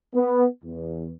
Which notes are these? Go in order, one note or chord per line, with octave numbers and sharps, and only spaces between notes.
B3
E2